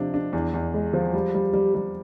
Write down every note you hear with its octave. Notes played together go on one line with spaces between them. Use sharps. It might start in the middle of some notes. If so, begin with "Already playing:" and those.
Already playing: C3 F3 D4
D4
E2
E2
G#3
F3
G3
G3
G3
G3